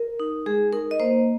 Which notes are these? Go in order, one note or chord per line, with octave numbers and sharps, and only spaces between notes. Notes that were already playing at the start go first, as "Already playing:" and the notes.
Already playing: A#4
D#4
G#3 G#4
D#4 A#4
D#5
A#3 C5